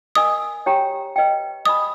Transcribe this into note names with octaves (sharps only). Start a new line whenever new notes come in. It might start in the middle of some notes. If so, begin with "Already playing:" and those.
A#4 D#5 G#5 D#6
G4 C#5 G5 A#5
B4 D#5 G5
B4 D#5 G#5 B5 D#6